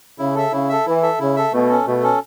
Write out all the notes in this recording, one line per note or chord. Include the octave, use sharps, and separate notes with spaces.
C#3 E4
A4 E5
C#3 E4
A4 E5
E3 E4
A4 E5
C#3 E4
A4 E5
B2 A3
C#4 A4
B2 A3
C#4 A4